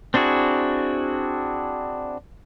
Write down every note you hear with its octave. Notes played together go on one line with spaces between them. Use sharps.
C4 D4 E4 F#4 G#4